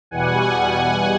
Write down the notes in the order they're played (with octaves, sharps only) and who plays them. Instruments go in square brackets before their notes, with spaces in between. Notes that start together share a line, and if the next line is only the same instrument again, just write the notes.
[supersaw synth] E2 B2 G3 F#5 G#5
F#5 G#5